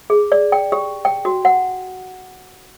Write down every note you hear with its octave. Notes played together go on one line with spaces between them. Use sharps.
G#4
D5
G5
G4
G5
F#4
F#5